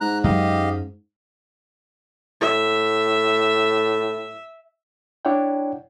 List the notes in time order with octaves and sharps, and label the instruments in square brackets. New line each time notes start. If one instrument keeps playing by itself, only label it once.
[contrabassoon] G#2 [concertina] A#5 F#6
[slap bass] F#2 F#3 G#3 [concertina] G4 D#5 F5
[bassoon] A2 [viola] E5
[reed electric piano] D4 E4 C#5 D5 F#5 G5